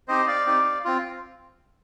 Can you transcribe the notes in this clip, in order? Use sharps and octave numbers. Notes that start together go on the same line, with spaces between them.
C4 D#4 G4 C5 D#5
D5 F5
C4 D#4 G4
C4 F4